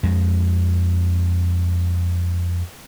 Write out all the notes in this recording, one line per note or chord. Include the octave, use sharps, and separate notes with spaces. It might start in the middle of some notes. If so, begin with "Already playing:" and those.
F2 G#3